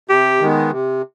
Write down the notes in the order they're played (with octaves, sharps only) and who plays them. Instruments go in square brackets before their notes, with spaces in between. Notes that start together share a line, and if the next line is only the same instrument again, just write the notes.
[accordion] C3 [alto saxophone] G4
[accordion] D#3 G#3 B3
C3